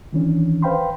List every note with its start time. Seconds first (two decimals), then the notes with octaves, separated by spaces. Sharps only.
0.13 D#3 E3 C#4 D4
0.62 B4 C5 F5 G5 B5 C6